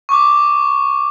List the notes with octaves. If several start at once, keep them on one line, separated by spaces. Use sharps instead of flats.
C#6 D6